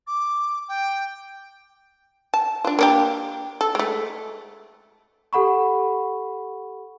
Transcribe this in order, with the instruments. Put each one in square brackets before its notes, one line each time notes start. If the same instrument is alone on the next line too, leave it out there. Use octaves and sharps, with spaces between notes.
[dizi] D6
G5
[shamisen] A5
D4 F4
A#3 D4 G4
A4
G#3 A3
[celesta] G4 A4 F#5 B5 C#6